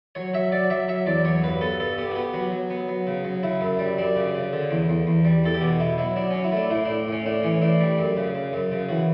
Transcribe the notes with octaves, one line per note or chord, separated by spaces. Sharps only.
F#3 C#5
F#3 E5
F#3 D5
F#3 E5
F#3 E5
E2 D5
F#3 C#5
G2 B4
B3 A4
G2 A4
B3 G4
F#4
B3 G4
F#3 F#4
F#3
B3
F#3
C#3
F#3
C#3 E4
F#2
G3
F#2 D4
C#3
C#3
D3
E2
E2
E2
G3
E2 A4
G4
B2 F#4
B2 E4
F#3 E4
F#3 D4
F#3 C#4
E4
A3 D4
A2 E4
A2 D4
A2 C#4
A2 D4
E3 C#4
A2 D4
G3
F#2
C#3
C#3
F#2
C#3
E3 F#4